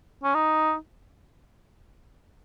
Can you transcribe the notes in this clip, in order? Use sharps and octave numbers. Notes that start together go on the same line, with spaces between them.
C#4
D#4